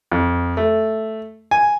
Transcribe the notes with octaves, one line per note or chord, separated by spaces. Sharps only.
F2
A3
G#5